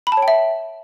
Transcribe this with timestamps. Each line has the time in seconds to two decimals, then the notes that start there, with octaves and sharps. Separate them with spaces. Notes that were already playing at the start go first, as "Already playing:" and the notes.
0.07 B5
0.12 A5
0.17 C#5
0.22 G5
0.28 E5